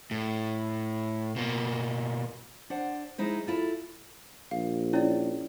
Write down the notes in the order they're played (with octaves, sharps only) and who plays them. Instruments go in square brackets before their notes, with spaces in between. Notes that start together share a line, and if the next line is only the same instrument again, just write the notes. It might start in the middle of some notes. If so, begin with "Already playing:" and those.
[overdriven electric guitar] A2
B2 A#3
[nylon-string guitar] D4 C5 F#5
G#3 D#4 E4 C5
E4 F4 A4
[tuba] A#1 [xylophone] F5
[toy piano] C#4 E4 [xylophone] C#5 D5